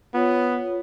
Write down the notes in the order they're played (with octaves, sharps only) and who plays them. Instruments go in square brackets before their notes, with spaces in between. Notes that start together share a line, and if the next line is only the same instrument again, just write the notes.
[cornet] B3 [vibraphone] F4 C#5